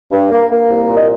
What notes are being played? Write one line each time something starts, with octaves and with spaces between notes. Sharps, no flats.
G2
A#3
A#3
C2
A#2
D#5